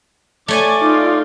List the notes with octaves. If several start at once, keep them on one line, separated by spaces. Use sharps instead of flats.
A3 C#5 D5 G#5 D6
D#4 F4